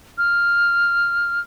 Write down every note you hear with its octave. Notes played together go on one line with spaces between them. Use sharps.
F6